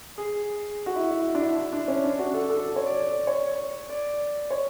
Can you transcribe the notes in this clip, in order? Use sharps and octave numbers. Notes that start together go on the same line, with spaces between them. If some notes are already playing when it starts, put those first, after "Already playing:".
G#4
F#4
E4
E4
D4
E4
E4
D4
C#4
D4
F#4
A4
A4
C#5
D5
C#5
D5
C#5